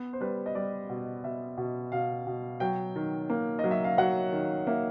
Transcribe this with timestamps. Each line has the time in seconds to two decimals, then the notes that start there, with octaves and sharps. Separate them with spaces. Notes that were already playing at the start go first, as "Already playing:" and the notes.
Already playing: B3
0.13 C5
0.21 G3 B4
0.46 D#5
0.55 G3 D5
0.89 B2
1.24 B2 E5
1.58 B2
1.92 B2 F5
2.27 B2
2.60 F#3 G5
2.96 D#3
3.30 A#3
3.59 D#5
3.64 F#3
3.71 E5
3.84 F5
3.98 F#3 F#5
4.33 D#3
4.67 A#3 E5